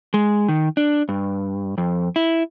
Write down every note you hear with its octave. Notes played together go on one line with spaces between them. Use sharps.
G#3
D#3
D4
G2
F2
E4